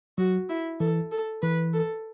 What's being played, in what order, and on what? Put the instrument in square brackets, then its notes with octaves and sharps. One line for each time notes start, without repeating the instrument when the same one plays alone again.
[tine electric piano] F#3 [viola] F#4
[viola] E4
[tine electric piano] E3 [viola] A4
[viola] A4
[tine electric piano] E3 [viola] B4
[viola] A4